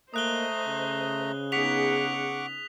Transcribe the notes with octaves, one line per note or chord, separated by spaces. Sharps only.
A3 A#3 C5 D#5 A#5 D#6 F#6 G7
C#3
B3 D#4 G#4 F#5 C#6 D6 B6 F7